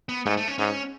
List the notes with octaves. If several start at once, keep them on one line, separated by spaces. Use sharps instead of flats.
B3
G#2 A3
A3
C#4
G#2 C#4